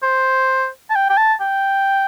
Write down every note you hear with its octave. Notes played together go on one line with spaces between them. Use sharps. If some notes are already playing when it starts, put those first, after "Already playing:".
C5
A5
G5
G5
A5
G5